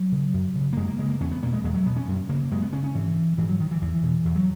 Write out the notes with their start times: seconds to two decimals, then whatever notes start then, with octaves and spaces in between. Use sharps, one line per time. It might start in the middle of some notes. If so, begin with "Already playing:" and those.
Already playing: F#3
0.12 C#3
0.34 F#2
0.55 C#3
0.73 A#3
0.77 F#2 G#3
0.88 A#3
0.99 C#3 G#3
1.09 A#3
1.20 E2 C#4
1.31 B3
1.42 B2 A#3
1.53 G#3
1.64 E2 G#3
1.74 F#3
1.86 B2 B3
1.97 C#4
2.08 F#2
2.29 C#3 A#3
2.51 F#2 G#3
2.62 B3
2.73 C#3 C#4
2.84 C#4
2.95 G#2 E3
3.38 G#2 E3
3.49 F#3
3.60 D#3
3.71 E3
3.82 E2 E3
4.03 B2
4.25 E2
4.36 F#3